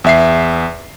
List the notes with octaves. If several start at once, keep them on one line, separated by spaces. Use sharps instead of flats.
E2 E5 C7